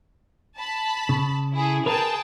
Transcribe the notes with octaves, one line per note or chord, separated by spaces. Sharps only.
A5 B5
C#3
E4 G#4 A4
G#4 A#4 B4 G5 A5